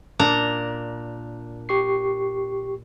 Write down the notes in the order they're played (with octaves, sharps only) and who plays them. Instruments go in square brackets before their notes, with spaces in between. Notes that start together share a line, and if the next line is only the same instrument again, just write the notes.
[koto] A#2 D4 A#5
[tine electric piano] G4 C#6 C7